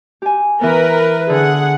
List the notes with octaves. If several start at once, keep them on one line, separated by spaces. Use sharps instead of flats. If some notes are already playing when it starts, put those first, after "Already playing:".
G4 G#5
E3 B3 A#4 B4
D3 G#4 F#5